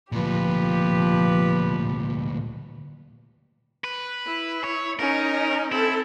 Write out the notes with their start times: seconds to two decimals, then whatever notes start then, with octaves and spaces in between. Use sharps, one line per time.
0.12 D2 A#2 F3 G4 B4
3.84 B4
4.26 E4
4.64 C#5
4.99 C#4 D#4 A#4
5.72 C4 E4 A4